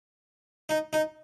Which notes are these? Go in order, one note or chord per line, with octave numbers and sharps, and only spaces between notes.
D#4
D#4